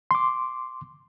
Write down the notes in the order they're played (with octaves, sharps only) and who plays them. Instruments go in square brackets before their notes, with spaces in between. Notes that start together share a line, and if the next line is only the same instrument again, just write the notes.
[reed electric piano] C6 D6